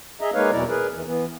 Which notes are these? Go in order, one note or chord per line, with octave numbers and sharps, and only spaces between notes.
G#4 D#5 E5 A#5
G#3 A#3 D#4 B4 C#5 F5
E2 B2 F#3 E4 D5 A#5
G#4 A#4 B4
E2 E3
E3 B3